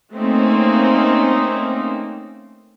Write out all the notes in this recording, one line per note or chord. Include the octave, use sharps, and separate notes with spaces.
A3 A#3 C4 C#4 D#4